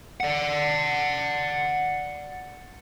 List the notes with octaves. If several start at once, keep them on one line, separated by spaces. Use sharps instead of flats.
D5 F#5